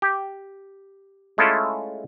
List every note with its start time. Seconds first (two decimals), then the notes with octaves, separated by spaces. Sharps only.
0.02 G4
1.38 G#3 A3 C#4 E4 F4 A4